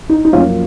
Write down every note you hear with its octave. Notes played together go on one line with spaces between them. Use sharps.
D#4
D#4
F#2 F3 A#3 C#4 F4